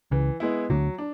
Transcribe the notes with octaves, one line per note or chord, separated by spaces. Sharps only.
C#2 C#3 E3
G#3 B3 E4
D2 D3 F#3
D4